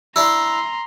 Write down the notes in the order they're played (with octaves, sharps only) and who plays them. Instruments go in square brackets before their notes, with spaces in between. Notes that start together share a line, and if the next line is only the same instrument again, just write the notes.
[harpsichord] D4 E4 [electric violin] A#5 C6